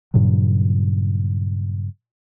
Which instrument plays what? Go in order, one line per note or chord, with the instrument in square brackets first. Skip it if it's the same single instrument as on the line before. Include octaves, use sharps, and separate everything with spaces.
[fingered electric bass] G2 A#2 C#3 F#3